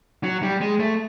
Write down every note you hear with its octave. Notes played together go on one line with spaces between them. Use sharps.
F#3
G3
G#3
A3